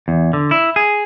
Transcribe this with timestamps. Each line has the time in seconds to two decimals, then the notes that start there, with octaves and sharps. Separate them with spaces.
0.08 E2
0.33 D3
0.51 E4
0.76 G#4